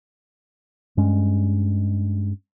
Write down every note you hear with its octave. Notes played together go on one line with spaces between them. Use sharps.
G2 G#3 C#4